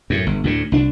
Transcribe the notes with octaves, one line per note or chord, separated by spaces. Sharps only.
F#2 A2
G1
D2 A2 D3
C2 D4